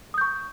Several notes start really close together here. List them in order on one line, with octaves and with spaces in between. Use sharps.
D#6 G6 C#6